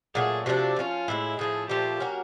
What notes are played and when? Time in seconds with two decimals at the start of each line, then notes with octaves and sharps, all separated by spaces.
0.15 A#2 F#3 A3 G#4
0.46 C3 F3 A3 D4 F#4
0.76 F3 A3 C#4 F4
1.08 A2 F3 G#3 E4
1.39 A2 F3 A3 G#4
1.70 A#2 F3 A3 G4
2.00 F#3 A#3 C#4 F#4